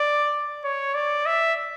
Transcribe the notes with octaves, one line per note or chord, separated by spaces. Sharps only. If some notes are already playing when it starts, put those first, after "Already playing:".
Already playing: D5
C#5
D5
E5